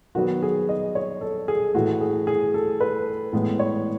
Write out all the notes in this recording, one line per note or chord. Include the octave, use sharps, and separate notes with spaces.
D#3 F#3 B3 F#4
G#4
D#5
C#5
A4
G#4
A2 E3 A3 F#4
G#4
G#4
A4
B4
A2 E3 G#3 B3
C#5